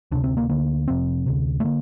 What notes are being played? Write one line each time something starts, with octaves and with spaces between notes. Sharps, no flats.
D2 C3 D4
C4
A#3
D2 D3 A#3
F1 F2 C3 C4
D2 C3
A3
D3 A#3